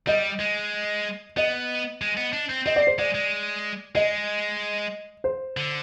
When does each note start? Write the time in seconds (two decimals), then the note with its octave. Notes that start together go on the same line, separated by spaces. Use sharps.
0.07 G3 D#5
0.40 G#3
1.37 B3 D#5
2.01 G#3
2.17 B3
2.33 D4
2.49 C4
2.66 C4 D#5
2.76 D5
2.87 C5
2.99 G#3 D5
3.14 G#3
3.95 G#3 D#5
5.24 C5
5.57 D3